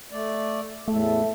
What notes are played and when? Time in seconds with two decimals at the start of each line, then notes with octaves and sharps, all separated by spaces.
0.12 A3 D5
0.88 E2 A2 A3 A4 E5